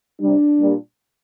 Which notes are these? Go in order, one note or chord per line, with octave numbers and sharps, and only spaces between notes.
C3 G3 D4
A#2 G3